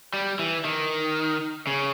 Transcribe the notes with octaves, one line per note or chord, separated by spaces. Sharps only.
G3
E3
D#3
C#3